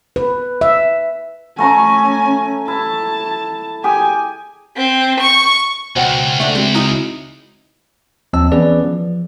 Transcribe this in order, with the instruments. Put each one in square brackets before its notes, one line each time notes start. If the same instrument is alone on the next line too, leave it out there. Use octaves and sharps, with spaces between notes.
[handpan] B4
E5
[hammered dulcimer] A3 A#5 C#6 [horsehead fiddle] C#4 G#5
[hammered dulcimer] E4 [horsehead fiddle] A5
[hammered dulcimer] G4 G#4 [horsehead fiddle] G#5
[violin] C4
C#6
[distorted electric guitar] C#2 [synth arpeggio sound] B2 [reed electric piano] C5 F#5 G5
[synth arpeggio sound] A3 D4
[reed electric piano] G#3 C4 F#4 [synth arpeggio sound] G5
[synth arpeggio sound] D#4 E4 D#6
[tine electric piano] D#2 F3 C4 D#5 A5 E6
E3 B3 C#4 G#4 B4 D5
F3